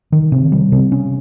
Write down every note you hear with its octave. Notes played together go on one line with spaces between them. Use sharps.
D#3
C3
G3
C3
C#4